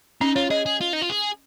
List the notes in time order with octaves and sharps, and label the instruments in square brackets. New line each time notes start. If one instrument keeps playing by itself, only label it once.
[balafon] C#4 [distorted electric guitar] D#4
[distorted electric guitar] F4 [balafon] C#5
[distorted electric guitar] G#4 [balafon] D#5
[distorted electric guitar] G#4
F4
D#4
F4
G#4